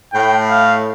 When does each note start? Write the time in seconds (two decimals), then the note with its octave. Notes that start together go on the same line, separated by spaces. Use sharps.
0.13 A2 G5
0.50 F5